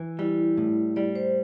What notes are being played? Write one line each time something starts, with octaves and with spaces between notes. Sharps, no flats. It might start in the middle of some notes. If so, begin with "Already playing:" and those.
Already playing: E3
G3 E4
A2
G3 D5
C5